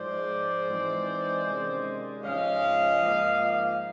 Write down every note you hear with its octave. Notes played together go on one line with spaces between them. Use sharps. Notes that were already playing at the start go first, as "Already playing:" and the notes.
Already playing: G#2 F3 G#3 C5 D5
E3 G#3 C4 D#4
C3 D#3 G#3 C#4
G#2 F3 G#3 C#4 D#5 F5
G#2 F3 A#3